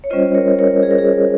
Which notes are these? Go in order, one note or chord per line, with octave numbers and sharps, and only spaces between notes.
C#5
G3 C#4 F4 C5 D#5
A#4 C#5
A#4 C#5
G#4
A#4
G#4